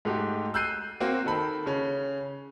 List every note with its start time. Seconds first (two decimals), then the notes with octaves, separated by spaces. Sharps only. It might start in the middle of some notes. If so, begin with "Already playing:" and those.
0.05 G#2 A3 F#4 G4
0.54 E6 F#6 G6 C7 D#7
1.00 A#3 C4 F#4
1.26 D#3 A4 B5
1.66 C#3 C#4